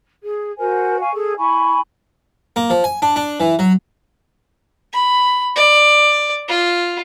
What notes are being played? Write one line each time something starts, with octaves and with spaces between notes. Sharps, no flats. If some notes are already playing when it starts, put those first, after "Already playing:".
G#4
F#4 A#4 C5 G#5
F5 G#5 C#6
G#4 A4
E4 G#5 B5 C#6
A#3
F3
G#5
D4
D4
E3
F#3
B5
D5
F4